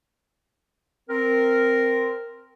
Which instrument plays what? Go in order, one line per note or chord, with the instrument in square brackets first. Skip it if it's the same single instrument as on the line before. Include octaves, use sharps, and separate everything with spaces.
[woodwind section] C4 A#4